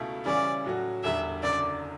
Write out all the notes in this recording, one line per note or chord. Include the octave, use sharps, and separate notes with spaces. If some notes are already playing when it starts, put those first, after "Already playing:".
Already playing: C#2 B2 A3 E4
C#3 E3 G3 C#4 D5
A2 F#3 C#4 F#4
E1 E2 D3 G3 E5
F#1 F#2 D3 D5